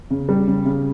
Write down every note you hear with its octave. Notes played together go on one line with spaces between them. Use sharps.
C#3
G3
C#3
C#3